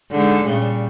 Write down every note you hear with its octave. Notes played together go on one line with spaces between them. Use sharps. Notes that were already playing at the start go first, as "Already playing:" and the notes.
D3 G#3 D#4
A#2 C#3 G3